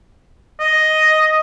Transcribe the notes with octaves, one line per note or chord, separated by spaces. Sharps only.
D#5